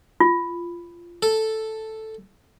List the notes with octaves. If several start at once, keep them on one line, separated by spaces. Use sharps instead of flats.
F4
A4